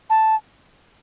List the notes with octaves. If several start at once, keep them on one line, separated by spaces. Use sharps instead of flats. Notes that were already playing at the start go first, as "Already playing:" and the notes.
A5